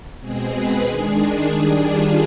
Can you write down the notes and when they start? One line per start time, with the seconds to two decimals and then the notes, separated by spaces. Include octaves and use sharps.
0.19 B2 G#3 C4 G#4
0.53 B4
0.86 D#3 G#3 D4 G#4
1.52 D#3 G3 D4
1.85 F4